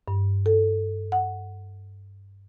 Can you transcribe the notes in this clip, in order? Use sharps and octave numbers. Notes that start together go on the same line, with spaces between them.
G2
A4
F#5